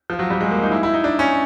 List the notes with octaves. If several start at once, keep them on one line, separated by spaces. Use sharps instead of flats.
F3
F#3
G3
G#3
A#3
D#4
E4
E4
D#4
D4
C#4